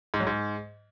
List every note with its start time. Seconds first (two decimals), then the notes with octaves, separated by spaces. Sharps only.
0.14 G#2
0.20 F#3
0.27 G#2